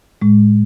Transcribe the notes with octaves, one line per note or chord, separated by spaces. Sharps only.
A2 G#3